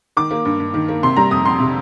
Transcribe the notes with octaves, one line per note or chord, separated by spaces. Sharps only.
D#3 D6
A#3
G2
G2
D#3
A#3
C3 C6
G3 A#5
F2 D#6
F2 C6
C3